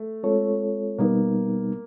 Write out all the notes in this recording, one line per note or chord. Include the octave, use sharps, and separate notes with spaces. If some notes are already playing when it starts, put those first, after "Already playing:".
Already playing: A3
G#3 C4 F4 A4 C#5
B2 G3 A#3 B3 D#4